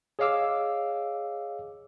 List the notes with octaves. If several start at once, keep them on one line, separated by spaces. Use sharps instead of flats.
G#4 C#5 D#5 F5 D6 E6